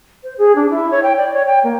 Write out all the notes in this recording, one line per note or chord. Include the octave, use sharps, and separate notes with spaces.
C5
G#4
D4
E4
C#5
G5
D5
C#5
G5
A#3